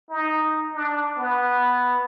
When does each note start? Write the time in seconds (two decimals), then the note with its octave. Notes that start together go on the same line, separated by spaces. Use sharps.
0.10 D#4
0.74 D4
1.18 B3